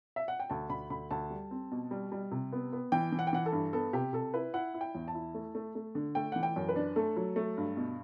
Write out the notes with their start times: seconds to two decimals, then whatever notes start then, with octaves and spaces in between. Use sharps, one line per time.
0.16 E5
0.28 F#5
0.40 G5
0.50 D2 A5
0.70 D2 B5
0.90 D2 B5
1.11 D2 A5
1.30 G3
1.51 C4
1.71 B2
1.91 G3
2.12 G3
2.31 C3
2.52 B3
2.73 B3
2.92 E3 G5
3.12 E3
3.19 F#5
3.27 G5
3.33 E3 F#5
3.46 A4
3.52 G2
3.73 B3 A4
3.93 C3 G4
4.13 C3 A4
4.34 E4 B4
4.54 E4 F#5
4.74 E4
4.81 G5
4.95 E2
5.08 A5
5.15 E4
5.35 A3
5.55 A3
5.75 A3
5.95 D3
6.15 A3 G5
6.32 E3 F#5
6.43 G5
6.56 F#2
6.69 B4
6.76 D4
6.96 A3 A4
7.16 F#3
7.36 A3
7.57 G2
7.77 B2